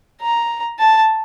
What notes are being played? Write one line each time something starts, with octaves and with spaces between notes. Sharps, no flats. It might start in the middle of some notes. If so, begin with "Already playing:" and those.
A#5
A5